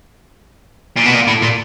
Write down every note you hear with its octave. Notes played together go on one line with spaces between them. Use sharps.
A#2
B2
A#2
A2
A#2